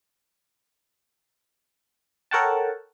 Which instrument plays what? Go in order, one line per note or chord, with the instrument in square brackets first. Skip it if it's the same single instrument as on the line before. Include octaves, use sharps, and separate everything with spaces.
[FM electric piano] A4 A#4 C#5 F#5 G5 A5